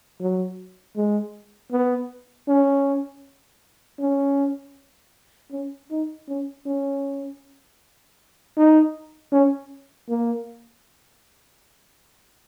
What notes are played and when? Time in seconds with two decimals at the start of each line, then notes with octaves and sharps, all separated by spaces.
0.20 F#3
0.96 G#3
1.72 B3
2.48 C#4
3.99 C#4
5.52 C#4
5.91 D#4
6.28 C#4
6.66 C#4
8.57 D#4
9.32 C#4
10.09 A#3